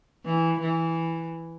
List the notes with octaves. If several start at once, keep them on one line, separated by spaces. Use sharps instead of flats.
E3
E3